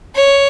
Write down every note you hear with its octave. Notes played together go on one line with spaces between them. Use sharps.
C#5